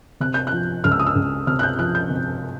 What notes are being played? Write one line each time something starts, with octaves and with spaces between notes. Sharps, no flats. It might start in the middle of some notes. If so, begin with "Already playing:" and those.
C3 F#6
G6
F#6
F3
C#2 F6
E6
D#6
E6
C#2
C3 F6
F#6
G6
F3 F#6
G6
C3